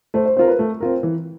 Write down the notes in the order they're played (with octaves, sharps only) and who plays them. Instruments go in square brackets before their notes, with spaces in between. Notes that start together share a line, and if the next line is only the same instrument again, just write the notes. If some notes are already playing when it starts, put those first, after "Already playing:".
[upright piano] A3 [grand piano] C5
[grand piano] C5
[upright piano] C4 F4 A#4 [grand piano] C5
[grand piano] B4
[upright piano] A3
C4 F4 A#4
E3